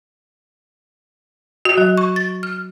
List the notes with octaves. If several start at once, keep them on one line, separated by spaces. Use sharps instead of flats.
F#4
F#3
C#6
A6
F6